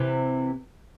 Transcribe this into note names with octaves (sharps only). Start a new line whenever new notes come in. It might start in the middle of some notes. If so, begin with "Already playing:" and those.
Already playing: C3 E3